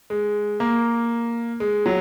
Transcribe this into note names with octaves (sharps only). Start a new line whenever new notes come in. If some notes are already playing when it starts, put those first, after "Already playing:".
G#3
A#3
G#3
F#3